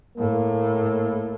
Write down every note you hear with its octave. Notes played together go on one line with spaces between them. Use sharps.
A2 A#3